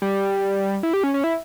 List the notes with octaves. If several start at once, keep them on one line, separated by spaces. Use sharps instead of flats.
G3
E4
G4
C#4
C#4
E4